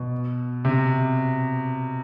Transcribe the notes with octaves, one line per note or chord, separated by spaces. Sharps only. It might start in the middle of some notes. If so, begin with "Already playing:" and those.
Already playing: B2
C3